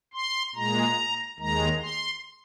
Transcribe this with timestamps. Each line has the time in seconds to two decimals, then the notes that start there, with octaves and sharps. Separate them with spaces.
0.14 C6
0.55 A#2 G#3 A#5
1.39 D#2 D#3 G#3 A#5
1.82 C6